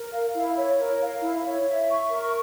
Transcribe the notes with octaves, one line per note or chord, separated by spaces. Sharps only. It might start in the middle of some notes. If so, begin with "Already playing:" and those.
Already playing: A#4
F5
E4
C#5
A#4
F5
E4
C#5
E5
C#6
A#4